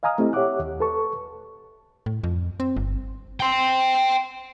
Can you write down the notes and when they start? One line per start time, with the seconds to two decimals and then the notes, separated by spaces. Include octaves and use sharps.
0.03 D#5 F5 G#5 A#5 D#6 F6
0.18 A3 C4 E4 G4 D#5
0.33 G4 C#5 E5 F#5 D6 F#6
0.59 D#2
0.80 A4 B4 A5 C#6
2.06 A2
2.24 F2
2.60 C4
2.76 G1
3.40 G5 C6